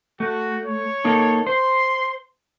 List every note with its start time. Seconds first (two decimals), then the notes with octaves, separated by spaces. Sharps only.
0.20 A3 F#4
0.66 C#5
1.05 A#3 D#4 A4
1.47 C5 C6